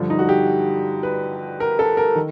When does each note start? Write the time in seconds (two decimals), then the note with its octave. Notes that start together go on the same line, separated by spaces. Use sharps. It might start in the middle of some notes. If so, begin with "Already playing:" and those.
Already playing: G2 D3 F3
0.10 D#4
0.19 F#4
0.29 G4
1.03 B4
1.60 A#4
1.79 A4
1.97 A#4
2.16 D#3